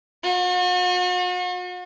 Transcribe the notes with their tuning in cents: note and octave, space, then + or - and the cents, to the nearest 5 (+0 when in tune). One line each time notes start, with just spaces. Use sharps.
F#4 -45